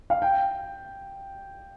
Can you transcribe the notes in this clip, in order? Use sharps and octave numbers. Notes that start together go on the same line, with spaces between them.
F5
G5